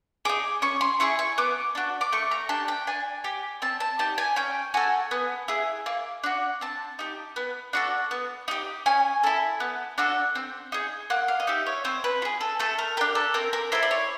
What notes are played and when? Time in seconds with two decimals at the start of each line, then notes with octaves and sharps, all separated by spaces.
0.25 D#4 G#4 D6
0.62 C#4 C#6
0.81 C6
1.00 E4 G#4 C#6
1.19 C#6
1.38 B3 D6
1.75 D4 F#4
2.01 D6
2.13 A3 C#6
2.31 A#5
2.49 D4 G4 A5
2.68 G5
2.87 D4 G#5
3.24 G4
3.62 C4 A5
3.80 A5
3.99 D#4 G4 A5
4.18 G#5
4.36 C#4 G5
4.74 F#4 A4 G#5
5.11 B3
5.48 E4 G#4
5.86 A#3
6.24 D4 F#4
6.61 C4 A5
6.99 D#4 G4
7.36 B3
7.73 D4 F#4 A4
8.11 B3
8.48 D#4 G4
8.86 C#4 G#5
9.24 E4 A4
9.60 B3
9.98 D4 F#4 A4
10.35 C4
10.72 D#4 G#4
11.10 A#3 F#5
11.28 F5
11.40 D#5
11.47 D#4 G4 E5
11.66 C#5
11.85 C4 C5
12.04 B4
12.22 F4
12.25 G#4
12.41 A4
12.60 A3 A4
12.79 A#4
12.97 D4 G4 A#4
13.15 A4
13.34 C4 A#4
13.53 A#4
13.72 E4 A4 C5
13.83 D5
13.91 C#5